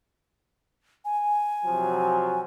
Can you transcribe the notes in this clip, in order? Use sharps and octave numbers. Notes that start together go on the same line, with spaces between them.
G#5
C3 F3 F#3